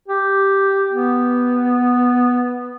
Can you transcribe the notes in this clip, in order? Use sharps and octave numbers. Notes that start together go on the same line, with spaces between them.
G4
B3